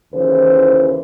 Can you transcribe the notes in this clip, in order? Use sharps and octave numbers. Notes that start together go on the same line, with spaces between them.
D#2 C#3 E3 C5